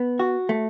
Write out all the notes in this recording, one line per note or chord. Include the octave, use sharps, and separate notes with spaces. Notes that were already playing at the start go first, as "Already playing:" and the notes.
Already playing: B3
F#4
A3